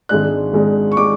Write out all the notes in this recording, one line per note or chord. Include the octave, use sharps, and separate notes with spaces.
G#1 G#2 G#3 D4 F#6
G#1 G#2 G#3 D4
C#6
G#3 D4 D6